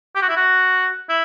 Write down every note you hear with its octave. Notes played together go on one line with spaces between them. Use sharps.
G4
F#4
E4
F#4
E4